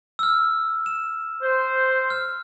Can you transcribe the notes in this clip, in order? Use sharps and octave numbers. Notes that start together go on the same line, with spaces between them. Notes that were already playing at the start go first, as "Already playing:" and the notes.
E6 F6
E7
C5
F6